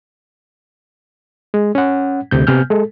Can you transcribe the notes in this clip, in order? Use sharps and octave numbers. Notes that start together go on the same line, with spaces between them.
G#3
C#4 F#5
D2 C3 G6
C3 B3 G#5 F6 G6
G#3 A4